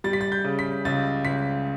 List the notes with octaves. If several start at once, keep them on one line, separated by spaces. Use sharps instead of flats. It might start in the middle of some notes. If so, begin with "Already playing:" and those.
G3 A6
B6
A6
G6
C#3
B6
C#2 A6
C#2 B6